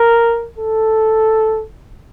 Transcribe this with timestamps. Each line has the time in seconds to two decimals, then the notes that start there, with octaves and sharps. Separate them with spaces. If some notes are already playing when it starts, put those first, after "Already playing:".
Already playing: A#4
0.58 A4